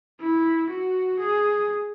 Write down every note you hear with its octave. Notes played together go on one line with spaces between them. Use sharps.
E4
F#4
G#4